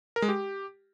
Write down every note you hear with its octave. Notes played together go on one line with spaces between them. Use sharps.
A#4
G#3
G4